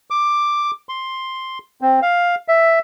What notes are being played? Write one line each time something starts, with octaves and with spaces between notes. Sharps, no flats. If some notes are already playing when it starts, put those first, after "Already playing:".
D6
C6
C4
F5
E5